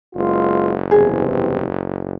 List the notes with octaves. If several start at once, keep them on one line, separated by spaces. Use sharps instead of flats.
F#1 G#3 B3 F4
E2 G2 C3 G#4